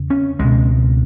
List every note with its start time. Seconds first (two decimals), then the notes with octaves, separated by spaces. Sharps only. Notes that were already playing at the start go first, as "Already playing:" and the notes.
Already playing: E2 C#3
0.10 C#4
0.39 C#2 B2 G#3